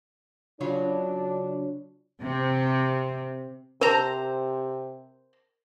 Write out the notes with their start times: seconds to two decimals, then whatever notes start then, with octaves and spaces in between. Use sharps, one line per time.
0.60 C#3 F#3 D4 F4
2.24 C3
3.81 C3 A#4 C5 A#5